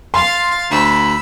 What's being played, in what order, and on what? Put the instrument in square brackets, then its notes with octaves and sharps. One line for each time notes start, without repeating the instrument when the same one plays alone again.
[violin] F5 A6 [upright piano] C6
[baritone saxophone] D2 [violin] B5 E6